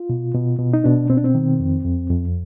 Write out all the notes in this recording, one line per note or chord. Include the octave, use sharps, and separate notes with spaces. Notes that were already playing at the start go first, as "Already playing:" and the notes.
Already playing: F4
B2
B2
B2
D#4
B2 D4
B2 C4
D4
C4
D#3
F2
F2
F2